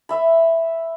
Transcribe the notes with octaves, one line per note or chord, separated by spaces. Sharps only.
E5 B5